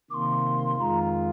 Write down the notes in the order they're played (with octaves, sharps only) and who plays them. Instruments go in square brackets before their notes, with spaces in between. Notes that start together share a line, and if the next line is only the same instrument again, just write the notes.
[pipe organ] C3 D#3 A#3 [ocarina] C6 D6
[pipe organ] F2 D#3 G#3 F4 [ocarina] A#5 C6